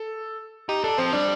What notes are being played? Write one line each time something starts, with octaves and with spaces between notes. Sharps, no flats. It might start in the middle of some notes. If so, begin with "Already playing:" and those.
Already playing: A4
D#4 G4
D4 A4
F3 C4 C5
G3 D4 D5